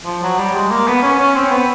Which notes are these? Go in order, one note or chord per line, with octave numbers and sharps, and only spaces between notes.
F3
F#3
G3
G#3
A#3
B3
C#4
C#4
C4
B3